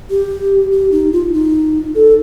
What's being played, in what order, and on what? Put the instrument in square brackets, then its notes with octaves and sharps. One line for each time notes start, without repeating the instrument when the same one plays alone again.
[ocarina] G4
G4
D#4
F4
D#4
A4